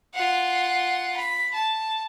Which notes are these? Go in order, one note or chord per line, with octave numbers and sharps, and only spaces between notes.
F4 F#5
B5
A5